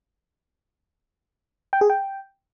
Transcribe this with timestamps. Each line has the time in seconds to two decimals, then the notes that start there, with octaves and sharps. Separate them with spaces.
1.73 G5
1.81 G#4
1.90 G5